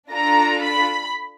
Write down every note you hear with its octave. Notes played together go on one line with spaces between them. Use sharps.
D4 F4 A4 A#5
B5